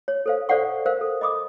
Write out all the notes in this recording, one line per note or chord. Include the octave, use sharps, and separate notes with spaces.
C#5
A4 C5 F5
A4 C5 D5 F5 F#5 C#6
A#4 C5 F5
A4
D#5 B5 D6 D#6